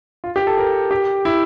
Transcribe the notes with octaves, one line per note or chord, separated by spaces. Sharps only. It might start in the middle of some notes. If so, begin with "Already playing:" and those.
F4
G4
A4
A#4
G4
E4